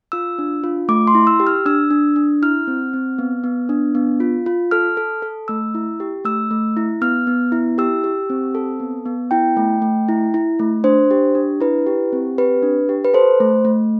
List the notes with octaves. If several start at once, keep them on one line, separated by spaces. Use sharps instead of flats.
F4 E6
D4
F4
A3 D6
C6
E4
E6
G4
F6
D4 E6
D4
D4
E4 F6
C4
C4
B3
B3
D4
B3
F4
F4
A4 F6
A4
A4
A3 E6
E4
G4
A3 E6
A3
E4
B3 F6
B3
E4
G4 E6
G4
C4
A4
B3
B3
E4 G5
A3
A3
E4
E4
A3
D4 C5
G4
D4
E4 B4
G4
C4
G4 B4
D4
G4
B4
A4 C5
A3
A3